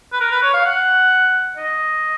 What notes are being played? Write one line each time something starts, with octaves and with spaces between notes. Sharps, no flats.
B4
A#4
B4
C#5
F5
F#5
D#5